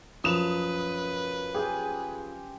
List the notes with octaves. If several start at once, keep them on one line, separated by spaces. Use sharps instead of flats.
F#2 F3 B4 D#6 E7 F7
G4 G#4 G#5 C6